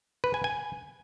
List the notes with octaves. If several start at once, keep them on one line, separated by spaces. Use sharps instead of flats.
B4
G#5
G#5